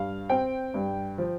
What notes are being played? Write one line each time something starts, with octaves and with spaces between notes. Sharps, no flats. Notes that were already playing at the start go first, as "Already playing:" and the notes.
Already playing: G2 F5
C4 G5
G2
F3